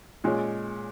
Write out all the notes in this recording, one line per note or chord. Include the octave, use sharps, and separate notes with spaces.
A#2 G#3 C#4